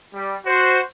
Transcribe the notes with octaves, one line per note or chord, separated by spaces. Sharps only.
G3
F#4 C5